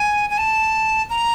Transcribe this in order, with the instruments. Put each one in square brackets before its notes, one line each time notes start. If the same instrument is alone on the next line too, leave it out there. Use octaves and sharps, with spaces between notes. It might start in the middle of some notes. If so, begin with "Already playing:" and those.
Already playing: [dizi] G#5
G#5
A5
A#5